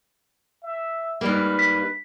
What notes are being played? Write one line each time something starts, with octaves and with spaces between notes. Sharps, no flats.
E5
G#2 G3 A#3 B4
B6